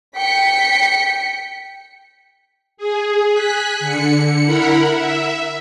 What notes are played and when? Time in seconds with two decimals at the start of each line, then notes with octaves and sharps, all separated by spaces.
0.15 G5 B6 C#7
2.77 G#4
3.33 G#5 F#6 B6
3.80 D3 C#7
4.45 E4 A#4 F#5 B5
4.92 E5